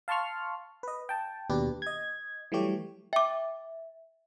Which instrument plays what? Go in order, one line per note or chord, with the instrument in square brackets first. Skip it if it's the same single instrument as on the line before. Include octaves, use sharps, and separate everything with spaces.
[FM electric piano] F5 A5 C6 C#6 F6
B4 D#5
G5 A5
D#2 B2 D4 G4 B4
D#5 G#6
E3 F#3 G3 A3 G4 C#5
[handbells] E5 [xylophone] G5 D6